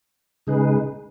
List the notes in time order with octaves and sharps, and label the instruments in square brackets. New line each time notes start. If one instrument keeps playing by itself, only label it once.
[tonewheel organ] C#3 G#3 D#4 G#4 B4